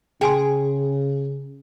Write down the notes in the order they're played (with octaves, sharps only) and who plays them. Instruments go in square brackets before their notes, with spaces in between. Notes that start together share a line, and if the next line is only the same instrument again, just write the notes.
[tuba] C#3 [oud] G#4 [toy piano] G5 G#5 C6